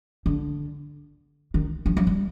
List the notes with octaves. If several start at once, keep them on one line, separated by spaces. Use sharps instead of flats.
D3
D#3
F3
F#3
G3